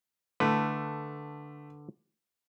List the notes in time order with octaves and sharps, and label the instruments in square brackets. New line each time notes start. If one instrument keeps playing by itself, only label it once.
[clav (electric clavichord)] D3 B4 [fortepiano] A3